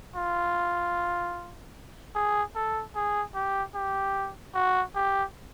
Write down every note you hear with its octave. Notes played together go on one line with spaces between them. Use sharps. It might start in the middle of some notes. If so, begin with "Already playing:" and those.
F4
G#4
A4
G#4
G4
G4
F#4
G4